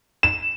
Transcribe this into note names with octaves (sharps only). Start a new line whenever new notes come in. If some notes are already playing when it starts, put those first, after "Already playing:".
E7